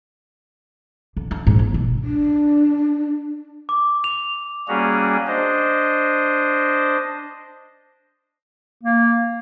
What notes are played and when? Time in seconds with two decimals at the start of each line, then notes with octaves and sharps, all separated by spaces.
1.17 D3
1.31 D4
1.47 G#2
1.59 G1
1.74 B1
2.04 D4
3.69 D6
4.04 F7
4.68 G3 A#3 C#4 F#4 G#4
5.27 D4 C5 D#5
8.83 A#3